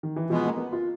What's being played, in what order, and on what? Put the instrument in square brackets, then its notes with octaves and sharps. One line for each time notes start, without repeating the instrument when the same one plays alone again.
[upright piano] D#3
E3
[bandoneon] B2 G#3 B3 [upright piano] F3
[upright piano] A#3
B3
F4